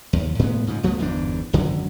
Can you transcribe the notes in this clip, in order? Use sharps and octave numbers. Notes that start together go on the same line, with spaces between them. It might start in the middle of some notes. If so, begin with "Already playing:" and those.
D#2
A2 G#3 B3
G#2 C#3 F3
C#2 F3 A3 B3
G1 E2 G#2 D4
G#1 F#2 D3 F#3